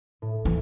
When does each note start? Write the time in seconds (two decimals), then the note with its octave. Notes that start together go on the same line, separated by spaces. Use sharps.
0.22 A2
0.45 E3